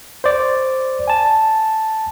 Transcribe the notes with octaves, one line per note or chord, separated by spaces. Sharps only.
C5 D5
G#5 A5